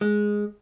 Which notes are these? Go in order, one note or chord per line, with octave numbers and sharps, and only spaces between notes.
G#3